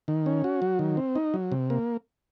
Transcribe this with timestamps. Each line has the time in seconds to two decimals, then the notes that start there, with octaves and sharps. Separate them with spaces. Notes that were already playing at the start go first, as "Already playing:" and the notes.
0.08 D#3
0.26 C#4
0.44 F#4
0.62 F#3
0.79 D#3
0.97 C4
1.16 D#4
1.34 F#3
1.52 C3
1.70 A#3